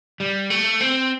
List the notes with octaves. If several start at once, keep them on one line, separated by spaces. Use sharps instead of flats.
G3
A3
C4